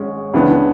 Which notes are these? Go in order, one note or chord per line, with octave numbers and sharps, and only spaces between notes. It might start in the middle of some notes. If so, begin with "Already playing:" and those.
Already playing: G#1 G#2 G#3 C#4
C#2 C#3 E3 B3 D4